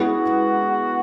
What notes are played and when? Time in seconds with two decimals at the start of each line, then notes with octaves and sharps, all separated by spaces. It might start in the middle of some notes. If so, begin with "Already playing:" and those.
Already playing: G#3 B3 E4 F#4 G#4